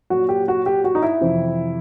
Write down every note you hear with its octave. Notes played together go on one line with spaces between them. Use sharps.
A#2 F#3 F#4
G4
F#4
G4
F#4
D#4
E4
F2 C3 E3